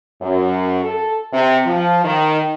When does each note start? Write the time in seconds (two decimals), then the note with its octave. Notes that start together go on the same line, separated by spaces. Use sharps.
0.21 F#2
0.84 A4
1.33 C3
1.66 F3
2.04 D#3